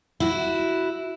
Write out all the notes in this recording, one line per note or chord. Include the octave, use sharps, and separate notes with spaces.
E4 F#4